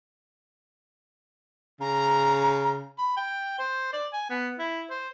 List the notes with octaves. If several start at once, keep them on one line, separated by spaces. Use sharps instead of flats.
C#3 A#5
B5
G5
C5
D5
G#5
B3
E4
C5